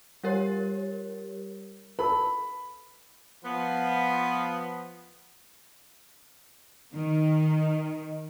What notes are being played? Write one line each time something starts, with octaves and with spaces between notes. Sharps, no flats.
G3 G4 A#4 C#5
A4 B4 B5
F3 B3
D#3